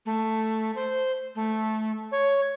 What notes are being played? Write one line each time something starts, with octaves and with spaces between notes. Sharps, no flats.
A3
C5
A3
C#5